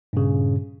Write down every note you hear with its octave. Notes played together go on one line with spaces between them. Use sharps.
G2 A#2 C#3